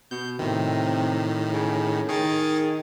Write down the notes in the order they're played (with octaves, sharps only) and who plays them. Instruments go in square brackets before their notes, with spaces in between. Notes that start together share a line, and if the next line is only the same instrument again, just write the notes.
[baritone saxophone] B2 [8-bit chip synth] G6
[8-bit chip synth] A2 D#3 [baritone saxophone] C3
[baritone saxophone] C#3
[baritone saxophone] D#3 [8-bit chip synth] G#4 A6